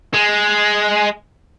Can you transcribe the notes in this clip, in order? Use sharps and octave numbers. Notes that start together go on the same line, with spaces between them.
G#3